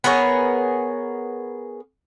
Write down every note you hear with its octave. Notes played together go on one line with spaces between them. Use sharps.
B3 G#4 A#4 C#5